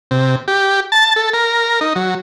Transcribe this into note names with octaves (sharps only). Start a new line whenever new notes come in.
C3
G4
A5
A4
A#4
D#4
F#3